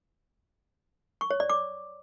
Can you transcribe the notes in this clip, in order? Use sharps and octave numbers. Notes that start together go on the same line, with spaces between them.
C#6
C#5
D5
D6